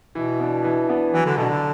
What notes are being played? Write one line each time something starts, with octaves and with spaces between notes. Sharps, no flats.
B2 E3
B3 D4
E3
B3 D4
E3 F#3
D3
B2 D4 F#4 A4
D3